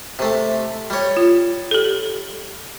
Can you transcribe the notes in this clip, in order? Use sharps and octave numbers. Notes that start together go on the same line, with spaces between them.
C3 A3
G3 C#5
F4
G4 A4